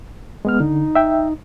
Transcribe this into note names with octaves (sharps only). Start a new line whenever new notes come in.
G#3 B3 F6
D3 D#4
E5 G5